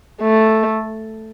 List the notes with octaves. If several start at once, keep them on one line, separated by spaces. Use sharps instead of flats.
A3